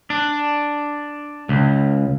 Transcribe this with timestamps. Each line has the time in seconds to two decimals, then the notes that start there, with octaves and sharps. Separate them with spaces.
0.10 D4
1.49 C#2